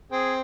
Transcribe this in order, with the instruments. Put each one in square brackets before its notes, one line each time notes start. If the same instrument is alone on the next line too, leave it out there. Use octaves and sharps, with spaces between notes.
[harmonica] C4 [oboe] G#4